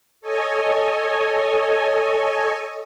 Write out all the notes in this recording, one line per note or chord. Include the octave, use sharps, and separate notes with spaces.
A4 C#5 D#5 G#5